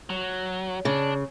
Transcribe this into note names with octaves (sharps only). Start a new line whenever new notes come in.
F#3
C#3 D4